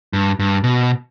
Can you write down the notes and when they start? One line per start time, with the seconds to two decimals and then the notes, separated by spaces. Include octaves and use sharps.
0.13 G2
0.39 G2
0.64 B2